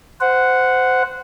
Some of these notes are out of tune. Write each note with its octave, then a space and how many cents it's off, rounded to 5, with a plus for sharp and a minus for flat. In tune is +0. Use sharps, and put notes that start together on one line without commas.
C5 -20 F#5 +0